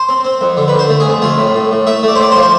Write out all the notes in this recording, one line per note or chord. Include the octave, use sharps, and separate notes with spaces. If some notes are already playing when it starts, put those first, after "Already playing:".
Already playing: C5
C4
C4
F2
D3
B4
D3
C5
A3
G#4
F2
A3 F4
A2
A2
A2
A3 E5
A3 D5
C5
A2 D5
C5
F3
C5